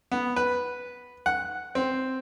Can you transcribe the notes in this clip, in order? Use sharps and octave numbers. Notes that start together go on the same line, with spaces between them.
B3
B4
F#5
C4